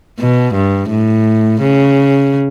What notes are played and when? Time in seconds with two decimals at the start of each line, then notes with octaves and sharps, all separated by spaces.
0.20 B2
0.55 G2
0.90 A2
1.61 C#3